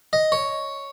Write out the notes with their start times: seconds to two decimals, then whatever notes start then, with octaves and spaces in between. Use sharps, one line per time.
0.13 D#5
0.32 C#5